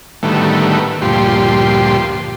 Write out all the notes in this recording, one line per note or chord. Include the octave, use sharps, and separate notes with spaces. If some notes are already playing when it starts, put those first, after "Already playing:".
A2 D3 D#3 G3 A3 B3
D2 G2 A#2 F3 G4 C6